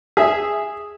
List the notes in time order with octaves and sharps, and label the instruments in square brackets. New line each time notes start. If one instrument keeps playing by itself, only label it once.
[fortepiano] G#4 E5